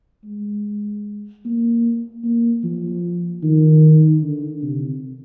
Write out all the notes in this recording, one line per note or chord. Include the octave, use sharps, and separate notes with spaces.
G#3
A#3
A#3
F3
D#3
D3
C3